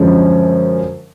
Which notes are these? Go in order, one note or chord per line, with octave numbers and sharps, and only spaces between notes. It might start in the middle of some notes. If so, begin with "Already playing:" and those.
Already playing: F#2 D3 F3 G#3 C#4